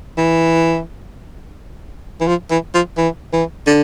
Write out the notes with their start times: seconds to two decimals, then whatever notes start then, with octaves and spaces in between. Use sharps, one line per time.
0.18 E3
2.20 E3
2.27 F3
2.51 E3
2.74 F3
2.97 E3
3.33 E3
3.67 D3